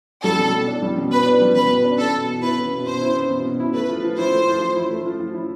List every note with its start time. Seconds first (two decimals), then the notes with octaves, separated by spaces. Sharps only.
0.24 G3 A4
0.38 B2
0.53 B2
0.67 D4
0.82 G3
0.97 B2
1.12 B2 B4
1.26 D4
1.41 G3
1.55 B2 B4
1.70 B2
1.84 D4
1.99 B3 A4
2.14 B2
2.29 B2
2.43 E4 B4
2.58 B3
2.72 B2
2.86 B2 C5
3.01 E4
3.16 B3
3.30 B2
3.45 B2
3.60 E4
3.74 A3 B4
3.89 F3
4.04 F3
4.18 E4 C5
4.32 A3
4.47 F3
4.61 F3
4.76 E4
4.90 A3
5.06 F3
5.20 F3
5.34 E4